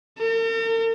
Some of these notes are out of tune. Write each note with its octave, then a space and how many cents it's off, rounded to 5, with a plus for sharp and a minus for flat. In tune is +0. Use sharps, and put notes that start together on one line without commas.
A#4 -45